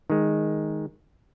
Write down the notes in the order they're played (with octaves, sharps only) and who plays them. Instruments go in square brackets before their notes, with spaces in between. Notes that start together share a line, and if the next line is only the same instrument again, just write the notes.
[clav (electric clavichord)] D#3 G#3